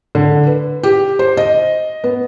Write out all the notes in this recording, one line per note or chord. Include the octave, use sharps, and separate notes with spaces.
D3
B4
G4
C5
D#5
B3